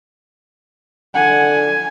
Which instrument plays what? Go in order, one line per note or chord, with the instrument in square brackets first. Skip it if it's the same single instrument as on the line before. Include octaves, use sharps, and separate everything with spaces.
[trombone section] D3 [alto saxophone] F#5 [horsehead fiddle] G#5